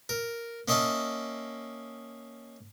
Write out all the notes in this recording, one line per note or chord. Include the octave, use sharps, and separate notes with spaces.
A#4
A#3 C#4 D#5 E5 A5